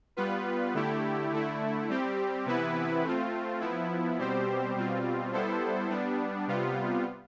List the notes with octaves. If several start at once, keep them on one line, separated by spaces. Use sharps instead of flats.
G3 B3 F4 B4
D3 A3 E4 G4
D3 A3 E4
G3 C4 G4
C3 E3 B3 E4 B4
A3 C4 F4
F3 B3 E4
B2 G3 C4 G4 C5
B2 G3 C4 F4
G3 B3 E4 A4 C5
G3 B3 D4
C3 G3 B3 F4